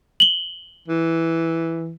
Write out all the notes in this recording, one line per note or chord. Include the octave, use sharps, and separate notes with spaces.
F#7 G7
E3